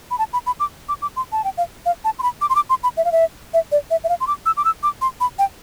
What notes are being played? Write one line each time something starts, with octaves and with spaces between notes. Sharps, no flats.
B5
A5
B5
B5
D6
D6
D6
C6
A5
G5
F5
F5
A5
C6
B5
D6
C6
D6
C6
B5
E5
F5
E5
E5
D5
E5
E5
F5
C6
D6
E6
D6
E6
D6
C6
B5
G5